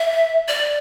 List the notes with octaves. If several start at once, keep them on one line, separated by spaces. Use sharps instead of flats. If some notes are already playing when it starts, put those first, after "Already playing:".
Already playing: E5
D5